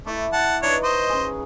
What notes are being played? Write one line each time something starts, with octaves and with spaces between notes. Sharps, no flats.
A3 E4 D5
F#5 A5
D4 D#4 B4 C#5 C#6
C5 D#5
C#3 G#4